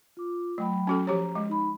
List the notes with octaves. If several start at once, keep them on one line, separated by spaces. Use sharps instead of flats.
F4 D6
F#3 A3 G5 B5
C#4 F#4 A4
F3 G4 C#5 A#5
G#3
D#4 B5